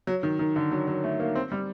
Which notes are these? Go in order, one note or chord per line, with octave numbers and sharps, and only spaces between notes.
F#3
D#3
D#3
D3
F#3
F#3
A3
A#3
C4
G3